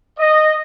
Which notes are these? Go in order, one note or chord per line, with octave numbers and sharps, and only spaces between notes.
D#5